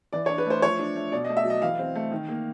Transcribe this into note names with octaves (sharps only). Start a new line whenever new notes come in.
E3 D5
D4 C#5
B4
A3 C5
F3 C#5
D4
A3
B2 D5
D#5
A3
E5
F#3
D#5
E3 F5
C4
A3
D#3
A#3